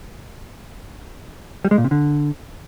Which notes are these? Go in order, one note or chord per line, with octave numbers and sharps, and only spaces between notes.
G3
G#3
A#2
C3
D3